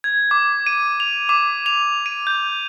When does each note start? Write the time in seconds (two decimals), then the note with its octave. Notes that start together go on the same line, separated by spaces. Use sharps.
0.04 G#6
0.31 D6
0.67 D#7
1.00 F7
1.29 D6
1.66 F7
2.06 D#7
2.27 G6